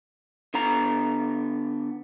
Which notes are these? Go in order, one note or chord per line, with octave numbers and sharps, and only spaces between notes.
D3 B3 A#5